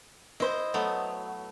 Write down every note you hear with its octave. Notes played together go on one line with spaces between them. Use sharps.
E4 C5 D#5
F#3 A3 B3